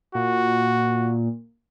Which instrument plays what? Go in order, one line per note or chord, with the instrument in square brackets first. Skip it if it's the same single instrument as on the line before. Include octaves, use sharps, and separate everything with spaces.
[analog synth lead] A#2 [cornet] F#4